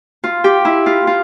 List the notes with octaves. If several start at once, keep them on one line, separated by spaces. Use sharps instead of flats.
F4
G4
E4
F4
F4